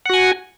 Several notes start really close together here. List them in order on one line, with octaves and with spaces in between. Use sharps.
F#5 F#4 G#5